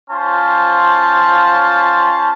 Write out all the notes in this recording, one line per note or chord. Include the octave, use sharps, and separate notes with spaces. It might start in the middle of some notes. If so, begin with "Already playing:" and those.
C#4 F4 C5 A5